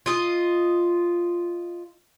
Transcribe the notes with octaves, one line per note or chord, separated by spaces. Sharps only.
F4 D#5